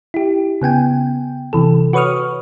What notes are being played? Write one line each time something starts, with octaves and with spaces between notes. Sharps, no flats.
E4 G4
C#3 B3 G5 G#5
C3 E3 A4
F#4 B4 C#5 C#6 D#6 F6